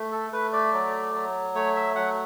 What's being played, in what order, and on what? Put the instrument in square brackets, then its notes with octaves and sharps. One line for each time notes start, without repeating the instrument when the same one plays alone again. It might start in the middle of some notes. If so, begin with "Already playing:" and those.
Already playing: [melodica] A3
A4
A3 B4
D5
F#3
F#3
A3 C#5
E5
F#3 F#5